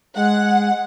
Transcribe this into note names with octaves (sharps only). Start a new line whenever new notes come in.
G#3 F#5